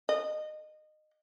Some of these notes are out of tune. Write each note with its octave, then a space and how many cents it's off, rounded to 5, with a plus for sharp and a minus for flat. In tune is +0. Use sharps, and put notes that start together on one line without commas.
D#5 -20